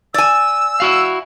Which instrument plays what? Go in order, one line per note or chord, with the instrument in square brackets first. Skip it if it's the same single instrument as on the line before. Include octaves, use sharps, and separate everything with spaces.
[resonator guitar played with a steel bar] D5 G#5 [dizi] E6
[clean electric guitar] E4 F#4 F5